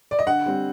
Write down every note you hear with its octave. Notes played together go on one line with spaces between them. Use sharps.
D5
D#5
D3 F#5
G3 C4